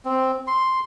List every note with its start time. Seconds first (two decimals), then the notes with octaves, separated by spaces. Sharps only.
0.05 C4
0.47 C6